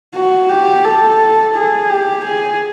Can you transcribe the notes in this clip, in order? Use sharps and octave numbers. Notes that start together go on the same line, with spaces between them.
F#4
G4
A4
G#4
G4
G#4